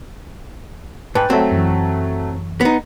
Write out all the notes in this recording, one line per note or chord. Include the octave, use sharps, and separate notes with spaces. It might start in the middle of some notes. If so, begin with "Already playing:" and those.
G#2 B4 G5 A5
F#3 A3 C4
F#2 E3
B3 D#4